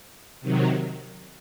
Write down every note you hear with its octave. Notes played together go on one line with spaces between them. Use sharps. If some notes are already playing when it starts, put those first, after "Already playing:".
C3 D#3 F#3